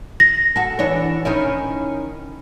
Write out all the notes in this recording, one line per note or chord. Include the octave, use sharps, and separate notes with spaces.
A#6
F#4 A4
E3 D4 C#5
D#3 C#4 E4